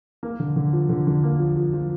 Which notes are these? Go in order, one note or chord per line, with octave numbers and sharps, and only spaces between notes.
A#3
D3
D3
F3
D3
D3
A#3
F3
F3
F3